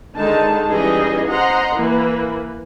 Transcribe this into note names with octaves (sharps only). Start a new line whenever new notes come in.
D3 D#3 G#3 D#4 A5
E3 G3 C#4 D#4 G#4 D#5
C5 D#5 F#5 A#5 C6
E3 A#3 B4